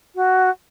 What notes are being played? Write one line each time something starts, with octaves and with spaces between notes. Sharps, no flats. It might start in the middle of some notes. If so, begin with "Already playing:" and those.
F#4